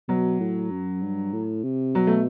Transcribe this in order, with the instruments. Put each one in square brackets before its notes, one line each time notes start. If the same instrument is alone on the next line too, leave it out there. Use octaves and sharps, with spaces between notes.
[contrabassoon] B2 [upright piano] F#3
[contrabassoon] A2
F#2
G2
A2
C3
[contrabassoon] B2 [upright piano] F#3
[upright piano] A3